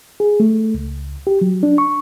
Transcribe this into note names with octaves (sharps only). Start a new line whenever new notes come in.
G#4
A3
C#2
G4
F#3
D4
C#6